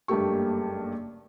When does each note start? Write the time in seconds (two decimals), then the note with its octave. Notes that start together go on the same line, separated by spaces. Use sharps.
0.08 F#1 G2 A3 A#3 G4 C#6